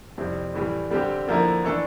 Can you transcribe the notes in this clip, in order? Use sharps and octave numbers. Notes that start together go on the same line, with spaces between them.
F2 C3 G3 C4 E4
A2 E3 G3
D3 G3 C4 G4
D3 F3 A#3 E4 A#4
E3 A3 D4 A4